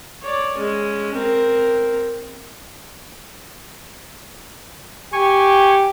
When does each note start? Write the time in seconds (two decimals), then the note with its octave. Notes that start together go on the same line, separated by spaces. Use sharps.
0.23 C#5 D5
0.57 G#3 C#4
1.14 C4 A#4
5.13 G4 G#5 C#6